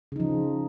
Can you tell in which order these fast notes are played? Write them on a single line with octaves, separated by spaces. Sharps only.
C#3 D#4 F3